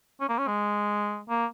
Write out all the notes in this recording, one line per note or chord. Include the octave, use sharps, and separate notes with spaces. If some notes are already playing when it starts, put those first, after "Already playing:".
C#4
A#3
C#4
G#3
A#3